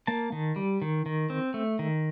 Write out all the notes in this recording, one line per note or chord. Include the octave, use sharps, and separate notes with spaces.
A#3 A5
D#3
G3
D#3
D#3
C4
A3
D#3